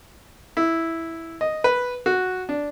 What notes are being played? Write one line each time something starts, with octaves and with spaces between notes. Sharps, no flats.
E4
D#5
B4
F#4
D4